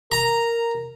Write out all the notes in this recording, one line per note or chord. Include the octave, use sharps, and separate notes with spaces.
A#4 A#5